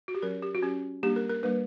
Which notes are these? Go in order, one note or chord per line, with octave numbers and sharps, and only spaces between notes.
F#4
G4
F#3 C#4 A#4
G4
F#4
F#3 C#4 G4
G3 A#3 D4 G4
A#4
A#4
G3 A#3 D4 B4